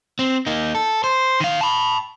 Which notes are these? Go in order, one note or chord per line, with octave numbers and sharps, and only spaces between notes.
C4
A#3 D#4
A4
C5
D#3 F5
A5 B5